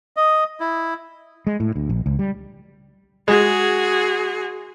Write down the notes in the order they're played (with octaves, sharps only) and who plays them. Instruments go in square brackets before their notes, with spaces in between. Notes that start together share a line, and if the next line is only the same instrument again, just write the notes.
[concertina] D#5
E4
[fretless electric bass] G#3
A2
D2
A#1
C#2
G3
[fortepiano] G#3 [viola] F#4 G#4